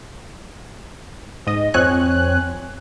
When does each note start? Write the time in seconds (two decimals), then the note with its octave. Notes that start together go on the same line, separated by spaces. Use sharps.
1.47 G#2 D#5
1.74 F2 C4 C#5 G#5 F#6